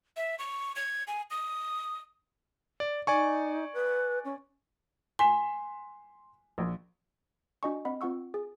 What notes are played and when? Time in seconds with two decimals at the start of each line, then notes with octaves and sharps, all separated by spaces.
0.17 E5
0.39 C#6
0.76 G#6
1.08 G#5
1.31 D#6
2.80 D5
3.07 D#4 D5 G#5 C#6
3.74 B4
4.25 C#4
5.19 G#5 C6 B6 E7
6.58 A#1
7.63 D4 F#4 D#5 G#5 C#6
7.85 C4 D#5 F#5 B5
8.01 C4 F4 F#5 C#6 E6
8.34 G#4